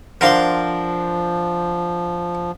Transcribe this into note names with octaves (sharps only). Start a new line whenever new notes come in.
F3 D4 A#4 C5 F5 F#5 C6